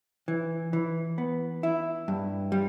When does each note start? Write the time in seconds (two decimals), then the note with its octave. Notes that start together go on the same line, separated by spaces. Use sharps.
0.28 E3
0.73 E3
1.18 B3
1.63 E4
2.08 G2
2.52 G3